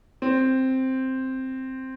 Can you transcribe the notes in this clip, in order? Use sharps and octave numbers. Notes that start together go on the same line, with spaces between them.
C4